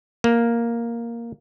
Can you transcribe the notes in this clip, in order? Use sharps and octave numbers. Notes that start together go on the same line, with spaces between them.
A#3